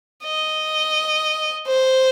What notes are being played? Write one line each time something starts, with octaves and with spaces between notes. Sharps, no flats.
D#5
C5